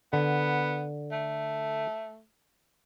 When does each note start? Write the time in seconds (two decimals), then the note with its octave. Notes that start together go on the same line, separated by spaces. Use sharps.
0.13 D3 B3
1.12 A3